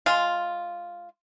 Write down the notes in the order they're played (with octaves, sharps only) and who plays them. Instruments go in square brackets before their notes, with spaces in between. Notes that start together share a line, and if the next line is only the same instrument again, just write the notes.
[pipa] G#3 F4